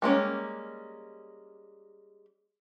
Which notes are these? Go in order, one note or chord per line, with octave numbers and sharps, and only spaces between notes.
G3 G#3 A#3 C#4